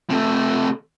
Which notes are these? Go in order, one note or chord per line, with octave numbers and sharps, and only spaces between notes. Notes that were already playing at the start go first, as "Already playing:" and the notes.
C3 A3